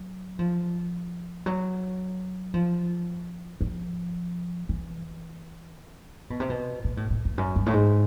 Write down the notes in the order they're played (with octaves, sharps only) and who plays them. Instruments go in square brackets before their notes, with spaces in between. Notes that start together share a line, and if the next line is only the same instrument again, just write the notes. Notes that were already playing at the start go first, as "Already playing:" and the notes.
Already playing: [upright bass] F#3
F3
F#3
F3
F3
E3
B2
C3
B2
A#2
A2
A2
F2
F#2
G2
A2
G#2